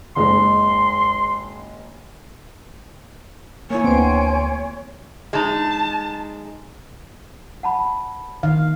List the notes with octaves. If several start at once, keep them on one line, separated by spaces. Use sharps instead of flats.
F#1 G#3 D#4 C6
A#3 E4 C#5 G#5
D2 B3 C4 C6 D7
G#3 D#4 A5
F#5 A5 B5
D#3 F5